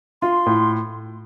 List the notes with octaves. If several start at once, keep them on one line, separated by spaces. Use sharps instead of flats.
F4 C6
A2